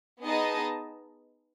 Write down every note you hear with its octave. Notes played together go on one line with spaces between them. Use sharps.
B3 D#4 G#4 D#5 A5